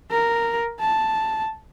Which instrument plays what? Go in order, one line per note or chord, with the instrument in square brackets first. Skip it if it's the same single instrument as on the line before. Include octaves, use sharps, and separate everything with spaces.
[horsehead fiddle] A#4
A5